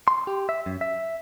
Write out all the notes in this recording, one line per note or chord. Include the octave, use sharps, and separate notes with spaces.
C6
G4
E5
F#2
E5